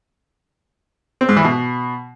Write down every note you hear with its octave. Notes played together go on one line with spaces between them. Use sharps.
C4
G#2
E3
B2